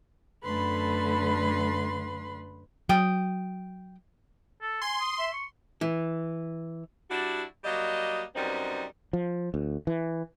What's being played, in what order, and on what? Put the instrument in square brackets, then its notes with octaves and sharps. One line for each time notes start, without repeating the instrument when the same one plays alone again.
[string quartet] F#2 D3 A3 B4 B5 C6
[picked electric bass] F#3 [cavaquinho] G5 D#6
[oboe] A4
[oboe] G#5 [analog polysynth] C6
[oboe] D#6
E5
C#6
[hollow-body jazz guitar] E3
[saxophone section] G3 D4 E4 F#4
F#3 G3 A#3 D#5
F#2 C3 G3 B3 C4 D#4
[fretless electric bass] F3
D2
E3